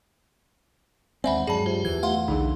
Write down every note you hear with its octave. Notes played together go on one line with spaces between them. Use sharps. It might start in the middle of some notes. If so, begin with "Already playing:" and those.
D#2 G#3 C4 D5 E5 F#5 G#5 B5
G2 F#3 G#3 G#4 D5 A5 B5
F4 G4 C5
E2 E3 G#6
A3 F5 F#5 C6
B1 D3 E3 D#4 G#4